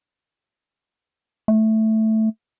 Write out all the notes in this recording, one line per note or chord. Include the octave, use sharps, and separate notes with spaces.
A3